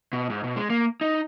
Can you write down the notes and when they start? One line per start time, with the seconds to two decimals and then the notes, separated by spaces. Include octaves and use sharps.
0.13 B2
0.30 G#2
0.44 B2
0.56 G#3
0.70 A#3
1.01 D#4